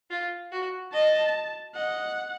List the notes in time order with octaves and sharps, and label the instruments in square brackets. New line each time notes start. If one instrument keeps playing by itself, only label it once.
[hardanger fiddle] F4
F#4
[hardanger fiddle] D#5 [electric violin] A5
[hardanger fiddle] D#5 [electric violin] F#5